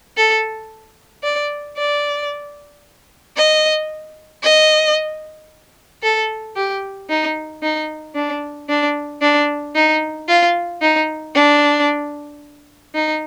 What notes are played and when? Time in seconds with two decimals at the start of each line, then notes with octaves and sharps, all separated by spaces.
0.17 A4
1.23 D5
1.77 D5
3.36 D#5
4.43 D#5
6.03 A4
6.56 G4
7.09 D#4
7.62 D#4
8.15 D4
8.69 D4
9.22 D4
9.75 D#4
10.28 F4
10.82 D#4
11.35 D4
12.94 D#4